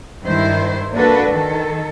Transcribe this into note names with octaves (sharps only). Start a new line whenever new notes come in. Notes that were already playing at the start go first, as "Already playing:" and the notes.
G2 D#3 E4 C5
A#3 D4 F#4 A4 B4
D#3 A4